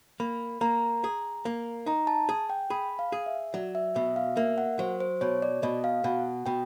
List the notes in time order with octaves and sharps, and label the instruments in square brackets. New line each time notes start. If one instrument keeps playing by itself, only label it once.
[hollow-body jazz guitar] A#3 [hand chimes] B5
[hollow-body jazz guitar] A#3 [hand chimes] A#5
[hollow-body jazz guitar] G#4
A#3
[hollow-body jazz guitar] D#4 [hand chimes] A#5
[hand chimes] A5
[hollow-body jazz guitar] G#4
[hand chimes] G5
[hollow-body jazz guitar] G#4 [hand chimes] B5
[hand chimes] F5
[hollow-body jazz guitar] G#4
[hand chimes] E5
[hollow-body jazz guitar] F#3 [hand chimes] D5
[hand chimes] E5
[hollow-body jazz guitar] B2 [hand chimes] E5
[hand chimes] F5
[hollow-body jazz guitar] A#3 [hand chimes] E5
[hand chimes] F#5
[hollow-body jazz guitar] F#3 [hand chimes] C5
[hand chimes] C5
[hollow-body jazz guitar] B2 [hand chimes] C#5
[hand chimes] D5
[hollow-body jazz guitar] B2 [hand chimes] D#5
[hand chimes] F5
[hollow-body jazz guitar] B2 [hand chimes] F#5
[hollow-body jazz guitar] B2 [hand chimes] G5